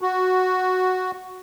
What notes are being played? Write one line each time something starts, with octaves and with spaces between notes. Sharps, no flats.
F#4